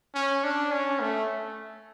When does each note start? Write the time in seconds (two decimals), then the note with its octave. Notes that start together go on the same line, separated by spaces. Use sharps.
0.15 C#4
0.44 D4
0.72 C#4
1.00 A3